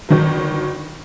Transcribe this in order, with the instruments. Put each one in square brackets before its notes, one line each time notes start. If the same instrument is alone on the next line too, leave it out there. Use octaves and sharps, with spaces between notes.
[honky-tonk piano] G1 D#3 F#3